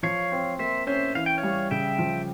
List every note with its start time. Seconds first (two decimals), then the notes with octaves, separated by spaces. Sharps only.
0.03 F3 C#5 F5
0.32 C4
0.59 A#3 C5 E5
0.87 C#4 C5 E5
1.15 E3 F5
1.26 G5
1.38 C#5 F5
1.43 G3
1.71 C#3 E5 G5
1.99 F3